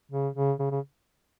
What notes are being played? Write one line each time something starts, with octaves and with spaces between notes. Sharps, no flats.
C#3
C#3
C#3
C#3